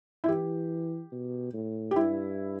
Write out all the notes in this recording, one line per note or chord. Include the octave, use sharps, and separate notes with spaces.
E4
E3 G4
B2
A2
G4
G2 E4